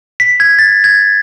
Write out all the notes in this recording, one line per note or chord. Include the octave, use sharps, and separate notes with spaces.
B6
G#6
A6
G#6